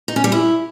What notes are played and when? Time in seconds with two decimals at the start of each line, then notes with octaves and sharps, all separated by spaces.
0.08 D#4
0.16 C#4
0.24 G3
0.32 E4